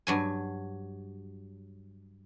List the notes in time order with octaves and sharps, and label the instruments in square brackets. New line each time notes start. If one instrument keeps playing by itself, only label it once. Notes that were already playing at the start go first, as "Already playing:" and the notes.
[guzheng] G2 F#3 G#5